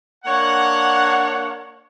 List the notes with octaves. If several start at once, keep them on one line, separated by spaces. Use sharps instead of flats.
A#3 D4 C#5 F#5